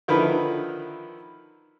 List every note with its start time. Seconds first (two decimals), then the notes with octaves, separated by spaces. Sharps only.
0.08 D3 D#3 F3 E4 A#4 B4